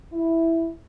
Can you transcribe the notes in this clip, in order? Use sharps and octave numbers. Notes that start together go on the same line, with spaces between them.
E4